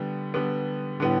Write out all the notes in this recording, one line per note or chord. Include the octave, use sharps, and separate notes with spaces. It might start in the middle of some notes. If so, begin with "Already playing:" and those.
Already playing: D3 G3 B3
D3 G3 B3
A2 D3 G3 B3